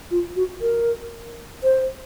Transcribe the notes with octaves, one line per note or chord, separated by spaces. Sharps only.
F4
F#4
A#4
C5